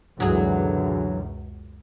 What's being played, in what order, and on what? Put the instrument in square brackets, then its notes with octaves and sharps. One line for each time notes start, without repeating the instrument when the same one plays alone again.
[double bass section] C#2 F#2 B2 [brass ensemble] D3 E3 [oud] F#3 G#4